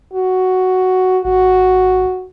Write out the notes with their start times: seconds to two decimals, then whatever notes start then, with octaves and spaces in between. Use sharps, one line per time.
0.13 F#4
1.25 G#1 F#4